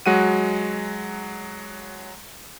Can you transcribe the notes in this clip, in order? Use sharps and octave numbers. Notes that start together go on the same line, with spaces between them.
F#3 G#3 F#4 F#5 D#7